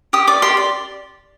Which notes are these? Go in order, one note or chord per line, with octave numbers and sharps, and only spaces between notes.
G4 D#6
D5 D6
G4 C6
D5